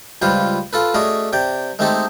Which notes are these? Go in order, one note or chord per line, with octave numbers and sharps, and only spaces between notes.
C#2 G3 F4 B4 C5
F4 A4 B4
A3 C#4 F#4 G#4 D5 D#5
C3 D5 G5
G#3 A3 C4 D#4 G4 A4